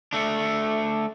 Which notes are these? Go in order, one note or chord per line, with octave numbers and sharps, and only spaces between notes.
A3 D4